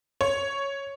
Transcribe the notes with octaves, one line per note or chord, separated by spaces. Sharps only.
C#5